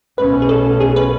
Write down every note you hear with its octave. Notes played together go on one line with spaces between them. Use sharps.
B1 B2 A3 C#4 B4
G#4
A4
G#4
B4